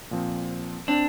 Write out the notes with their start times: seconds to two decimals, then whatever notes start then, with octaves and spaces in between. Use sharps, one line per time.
0.11 A#2 F3 C4
0.88 C4 D4